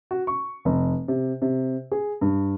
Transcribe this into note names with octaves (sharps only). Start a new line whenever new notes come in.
F#4
C#6
F1
C3
C3
G#4
G2